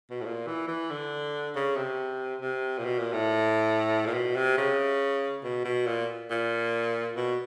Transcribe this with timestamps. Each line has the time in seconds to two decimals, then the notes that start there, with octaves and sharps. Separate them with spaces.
0.10 B2
0.21 A2
0.25 A#2
0.47 E3
0.68 E3
0.91 D3
1.55 C#3
1.77 C3
2.41 C3
2.79 A#2
2.85 B2
2.99 A#2
3.13 A2
4.06 A#2
4.14 B2
4.36 C3
4.58 C#3
5.44 B2
5.65 B2
5.87 A#2
6.30 A#2
7.16 B2